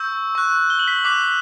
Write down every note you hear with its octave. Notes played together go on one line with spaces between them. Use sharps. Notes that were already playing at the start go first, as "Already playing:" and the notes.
Already playing: C#6 E6 G6
C#6 F#6
G7
F#7
B6
D6 F#6 B6